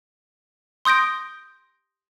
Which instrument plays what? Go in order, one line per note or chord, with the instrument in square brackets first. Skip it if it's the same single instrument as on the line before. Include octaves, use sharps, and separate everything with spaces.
[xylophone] C6 D#6 G6 A#6 D7